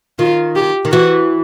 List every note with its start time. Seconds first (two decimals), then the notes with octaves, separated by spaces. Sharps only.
0.19 D#3 F4
0.56 G4
0.85 D#3
0.92 E3 F#4